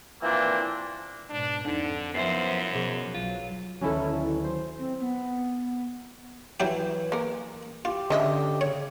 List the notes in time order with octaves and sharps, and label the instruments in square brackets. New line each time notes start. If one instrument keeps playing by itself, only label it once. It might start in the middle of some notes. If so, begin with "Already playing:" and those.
[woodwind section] A#2 E3 F3 A#3 C4 D4
[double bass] G#2 B2 [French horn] D4
[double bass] F2 [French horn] D3 [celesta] D4 D#4
[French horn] F#2 [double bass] F3 F#3 [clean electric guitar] B3 E4 C5 [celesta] E5 C7
[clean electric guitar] B2 [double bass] F3 F#3 [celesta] G#4
[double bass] B1 F#3 [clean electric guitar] F4
[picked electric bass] D2 D#3 F#3 [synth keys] C#4 E4 A4
[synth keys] C5
[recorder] C4
B3
[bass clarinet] E3 [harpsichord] F#3 E4 G4
[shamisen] A#3 A#4
[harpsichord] F4 [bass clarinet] G4
[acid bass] D3 [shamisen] C#4 D#5 E5
[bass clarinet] C#3 [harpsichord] C#5